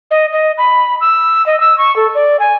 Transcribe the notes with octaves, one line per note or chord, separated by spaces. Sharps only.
D#5
D#5
B5
E6
D#5
E6
C#6
A4
D5
G#5